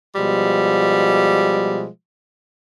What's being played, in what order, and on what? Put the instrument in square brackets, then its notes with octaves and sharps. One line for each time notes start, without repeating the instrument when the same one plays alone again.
[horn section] B2 F3 G3 G#3